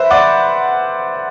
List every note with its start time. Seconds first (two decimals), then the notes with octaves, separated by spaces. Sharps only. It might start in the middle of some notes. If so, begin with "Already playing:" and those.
Already playing: B4 C5 E5
0.10 D5 F#5